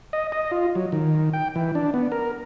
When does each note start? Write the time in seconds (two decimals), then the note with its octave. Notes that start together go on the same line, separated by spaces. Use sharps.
0.13 D#5
0.32 D#5
0.51 F4
0.75 F#3
0.92 D#3
1.33 G5
1.56 E3
1.75 D4
1.94 B3
2.12 A#4